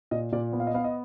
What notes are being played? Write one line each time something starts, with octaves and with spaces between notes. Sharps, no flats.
A#2 D#5
A#2 D5
B3
F5
D#5
B3 F5
D#5